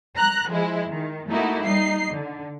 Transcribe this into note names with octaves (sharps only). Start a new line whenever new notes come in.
A#5 F#6
F3 G#3 E4
D#3
A3 A#3 D#4 E4 F#4
G3 D#4 C7
D3